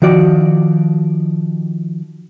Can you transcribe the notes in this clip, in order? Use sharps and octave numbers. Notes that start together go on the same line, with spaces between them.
D#3 F3 F#4 D5